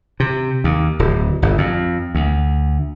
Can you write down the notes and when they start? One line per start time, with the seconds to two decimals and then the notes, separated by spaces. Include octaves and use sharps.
0.20 C3
0.64 D#2
0.99 D1
1.42 G1
1.58 F2
2.15 D2